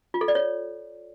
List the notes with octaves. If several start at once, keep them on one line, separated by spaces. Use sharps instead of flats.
F4
A4
D5
C#5